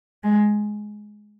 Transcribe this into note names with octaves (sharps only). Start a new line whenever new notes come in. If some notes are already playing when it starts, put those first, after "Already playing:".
G#3